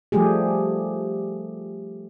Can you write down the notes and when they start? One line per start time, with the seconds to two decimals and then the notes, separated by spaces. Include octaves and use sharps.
0.12 F3 G3 A3 G4 G#4